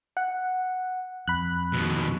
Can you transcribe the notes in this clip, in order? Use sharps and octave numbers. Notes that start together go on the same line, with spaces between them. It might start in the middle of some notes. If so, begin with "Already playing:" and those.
F#5
F2 B5 F#6
D#2 B2